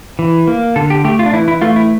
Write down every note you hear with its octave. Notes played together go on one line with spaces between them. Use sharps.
E3
A#3
D3 A4
G4
A3 G4
F4
D4
E3 E4
E4
A3 F4
E4